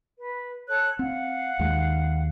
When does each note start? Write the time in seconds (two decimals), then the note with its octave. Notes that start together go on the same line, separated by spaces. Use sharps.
0.19 B4
0.67 A4 C#5 F#6
0.99 C4 F5 F#5
1.59 D#2 D#3 G#3